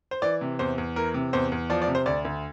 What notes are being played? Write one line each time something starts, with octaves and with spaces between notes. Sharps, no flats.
C5
E3 D5
C3
E2 C5
E2
E3 A#4
C3
E2 C5
E2
F3 D5
D5
C3
C5
D2 D5
D2